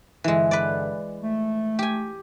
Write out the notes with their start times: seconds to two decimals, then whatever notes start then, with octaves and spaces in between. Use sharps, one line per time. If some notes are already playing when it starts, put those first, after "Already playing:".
0.24 G2 D3 E3 G#3
0.51 B4 D5
1.22 A3
1.79 G4 G#5